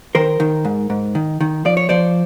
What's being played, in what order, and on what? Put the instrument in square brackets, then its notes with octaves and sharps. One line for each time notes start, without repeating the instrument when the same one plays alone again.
[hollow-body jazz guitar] D#3 A#4 C5
D#3
G#2
G#2
D#3
D#3
F3 D5
C#5
F3 C5 D5